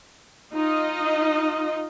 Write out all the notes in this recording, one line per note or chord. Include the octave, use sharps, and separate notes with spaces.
D#4 F4 D#5